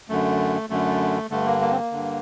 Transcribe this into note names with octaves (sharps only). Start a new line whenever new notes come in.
F#2 D3 A3
F#2 D3 A3
G2 D3 A3
A#3
A#3
C4
A#3
G2 D3